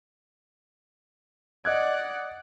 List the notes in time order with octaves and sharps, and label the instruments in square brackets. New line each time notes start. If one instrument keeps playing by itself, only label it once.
[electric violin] D5 F#5 [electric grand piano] D#5 F#6 G#6